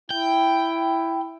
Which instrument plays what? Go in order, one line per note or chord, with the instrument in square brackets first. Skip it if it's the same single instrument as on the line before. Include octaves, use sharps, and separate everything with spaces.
[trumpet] E4 [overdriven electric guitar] G5